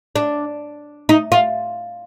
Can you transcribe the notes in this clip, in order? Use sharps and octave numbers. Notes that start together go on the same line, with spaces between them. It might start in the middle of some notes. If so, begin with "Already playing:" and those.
D4
D#4
F4